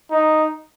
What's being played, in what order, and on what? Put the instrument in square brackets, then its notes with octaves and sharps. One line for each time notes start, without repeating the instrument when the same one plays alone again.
[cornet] D#4